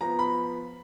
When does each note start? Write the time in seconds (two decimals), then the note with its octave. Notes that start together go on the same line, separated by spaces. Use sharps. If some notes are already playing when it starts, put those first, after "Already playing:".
0.01 F3 B3 A#5
0.19 B5